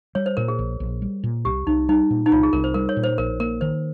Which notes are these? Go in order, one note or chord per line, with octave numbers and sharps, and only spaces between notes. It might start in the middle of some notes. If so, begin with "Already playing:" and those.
G3 C#5
C5
A#2 A#4
G#4
A#1
A#1
G3
A#2
C2 G4
C2 D#4
G3 D#4
A#2
D#4
C2 F4
G#4
C2 A#4
C5
G3 A#4
C#5
A#2
C5
A#1 A#4
A#3 A#4
D#3 C5